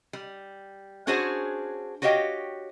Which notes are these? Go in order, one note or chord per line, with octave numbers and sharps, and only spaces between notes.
G3
C#4 D4 F#4 G#4 C5 C#5
F#4 G4 C#5 D#5 F5 G5